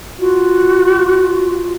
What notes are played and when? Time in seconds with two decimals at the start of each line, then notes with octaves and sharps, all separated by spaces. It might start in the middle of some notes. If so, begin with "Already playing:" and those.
0.20 F4 F#4